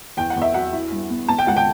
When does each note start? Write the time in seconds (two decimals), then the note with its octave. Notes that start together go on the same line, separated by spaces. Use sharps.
0.17 E2 G5
0.30 F#5
0.36 E2
0.42 E5
0.54 F#3 F#5
0.73 E4
0.92 G2
1.10 B3
1.28 B3 A5
1.39 G5
1.47 C#2 F#5
1.57 G5